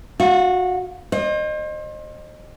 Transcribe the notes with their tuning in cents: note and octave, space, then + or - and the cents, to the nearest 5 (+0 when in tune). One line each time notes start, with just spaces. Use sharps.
F#4 -20 F5 +0
C5 +35 D#5 -30